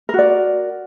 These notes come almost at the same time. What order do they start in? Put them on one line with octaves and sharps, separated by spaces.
A#4 F#4 D5